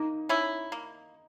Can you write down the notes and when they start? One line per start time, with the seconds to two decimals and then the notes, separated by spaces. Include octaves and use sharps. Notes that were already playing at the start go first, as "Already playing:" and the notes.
Already playing: A#3 D#4
0.29 C#4 E4
0.72 A#3